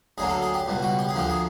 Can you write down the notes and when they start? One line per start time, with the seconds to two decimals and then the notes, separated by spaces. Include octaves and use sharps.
0.18 D2 D3 F#3 A#3 G#4
0.30 A4
0.42 G#4
0.54 G4
0.66 C#2 B2 G3
0.83 F#4
0.99 G4
1.09 G#4
1.14 D2 D3 F3 A#3 G4
1.29 G#4